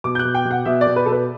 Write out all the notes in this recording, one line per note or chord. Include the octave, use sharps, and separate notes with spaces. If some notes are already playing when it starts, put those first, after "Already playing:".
B2 D6
G6
F#6
B2
G5
B2
F#5
B2 E5
D5
B2
B4
B2 A4
B4